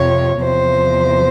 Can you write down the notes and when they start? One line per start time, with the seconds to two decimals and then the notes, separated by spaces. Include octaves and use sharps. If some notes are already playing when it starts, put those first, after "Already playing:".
Already playing: F2 C3 F3 C#5
0.41 E2 C3 F3 C5